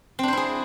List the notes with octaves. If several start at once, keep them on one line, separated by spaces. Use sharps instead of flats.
C4 D4 E4 G#4 C5